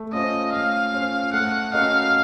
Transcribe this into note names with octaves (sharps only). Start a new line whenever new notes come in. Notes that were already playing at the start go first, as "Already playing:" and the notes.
Already playing: A3
C#4 F4 C5 D#5
A3 F5
C#4 F4 C5
A3 F#5
C#4 F#4 A#4 D#5 F5